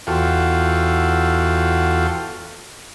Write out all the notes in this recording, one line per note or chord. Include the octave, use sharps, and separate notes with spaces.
E2 F4 F#4 A4 G5